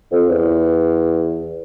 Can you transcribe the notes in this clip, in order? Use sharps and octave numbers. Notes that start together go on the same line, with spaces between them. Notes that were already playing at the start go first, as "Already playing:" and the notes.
F2
E2